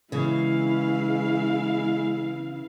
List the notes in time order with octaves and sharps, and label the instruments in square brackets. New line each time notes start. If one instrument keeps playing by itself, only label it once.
[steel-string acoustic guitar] C#3 E3 [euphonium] G#3 [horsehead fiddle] E4 F5